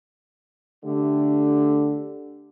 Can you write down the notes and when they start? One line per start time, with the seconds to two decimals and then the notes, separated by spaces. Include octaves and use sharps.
0.85 D3 A3 G4